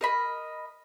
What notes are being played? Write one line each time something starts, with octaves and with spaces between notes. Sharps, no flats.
A#4 D#5 B5